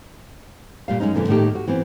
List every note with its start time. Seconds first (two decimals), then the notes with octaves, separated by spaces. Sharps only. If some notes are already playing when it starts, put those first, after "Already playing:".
0.88 A#2 G3 F5
1.00 F#2 G#3 C#4 D#4
1.15 F2 A#2 D3 E3
1.28 A2 D#3 A3 A#3 D#4 G4
1.55 F#4
1.68 E3 B3 C4